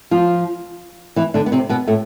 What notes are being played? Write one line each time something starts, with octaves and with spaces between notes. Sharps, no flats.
F3 F4
E3 E4
D3 D4
B3
C3 C4
B2 B3
A2 A3